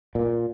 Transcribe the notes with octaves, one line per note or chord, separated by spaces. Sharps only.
A#2